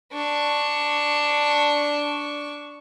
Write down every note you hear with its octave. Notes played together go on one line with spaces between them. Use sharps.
D4 C#6